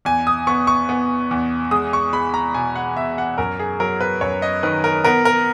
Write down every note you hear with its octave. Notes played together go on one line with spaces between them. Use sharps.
E2 G#5
D#6
B3 C#6
C#6
B3
E2
G#3 D#6
C#6
G#3 B5
A#5
B2 G#5
F#5
B2 E5
F#5
F#2 A#4
G#4
F#3 A#4
B4
F#2 C#5
D#5
D#3 B4
A#4
B3 A#4
A#4